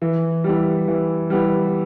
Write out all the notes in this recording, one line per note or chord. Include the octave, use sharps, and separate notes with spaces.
E3
G3 B3 E4
E3
G3 B3 E4